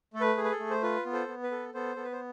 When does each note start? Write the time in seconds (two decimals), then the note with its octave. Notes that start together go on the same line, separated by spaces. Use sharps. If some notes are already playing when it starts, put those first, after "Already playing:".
0.13 A3 A4
0.21 B4
0.37 G#4
0.44 B4
0.52 A4
0.60 A3
0.70 C5
0.82 F4 B4
1.05 B3
1.13 A4 C5
1.28 B3
1.43 B4
1.51 A4
1.74 B3 A4 C5
1.96 B3 A4
2.04 B4
2.12 C5